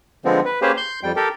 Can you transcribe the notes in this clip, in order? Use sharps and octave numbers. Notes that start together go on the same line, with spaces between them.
D3 F3 G#3 B3 C4
B4
A#3 C#4 G4 G#4 B4 C5
C6 G6
F2 G3 G5
G4 A4 A#4